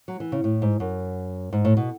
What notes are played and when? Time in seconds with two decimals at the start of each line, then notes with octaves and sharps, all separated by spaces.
0.08 F#3
0.20 E3
0.32 C#3
0.44 A2
0.62 G#2
0.80 F#2
1.53 G#2
1.65 A2
1.77 B2